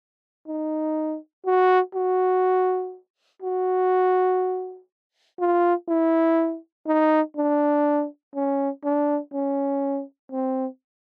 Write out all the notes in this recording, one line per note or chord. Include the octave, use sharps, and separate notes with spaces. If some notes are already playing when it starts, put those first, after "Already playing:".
D#4
F#4
F#4
F#4
F4
E4
D#4
D4
C#4
D4
C#4
C4